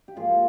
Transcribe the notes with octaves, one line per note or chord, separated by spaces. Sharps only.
G4
G#2 F3 A#3 F4 G#4